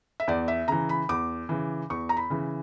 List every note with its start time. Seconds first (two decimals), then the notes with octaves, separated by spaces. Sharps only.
0.20 E5
0.28 E2 D5
0.48 E5
0.68 C#3 E3 A#5
0.89 B5
1.09 E2 D6
1.49 C#3 E3
1.90 E2 C#6
2.09 A#5
2.17 B5
2.30 C#3 E3